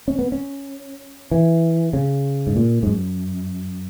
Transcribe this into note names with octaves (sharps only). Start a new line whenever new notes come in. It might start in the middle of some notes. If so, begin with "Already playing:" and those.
C#4
B3
C#4
E3
C#3
G#2
A#2
G#2
F#2